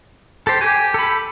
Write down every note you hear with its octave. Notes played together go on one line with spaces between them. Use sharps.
G4 A4 C5
G4 G#5
A4 B5